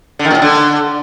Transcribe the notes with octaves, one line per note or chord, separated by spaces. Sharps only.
D3
D#3
A#2
A2
D3